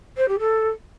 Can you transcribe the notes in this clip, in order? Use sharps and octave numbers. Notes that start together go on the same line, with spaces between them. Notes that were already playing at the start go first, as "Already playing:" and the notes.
C5
G4
A4